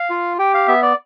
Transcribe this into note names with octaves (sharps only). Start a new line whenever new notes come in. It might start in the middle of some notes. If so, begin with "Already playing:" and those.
Already playing: F5
F4
G4 G5
F5
B3 E5
D5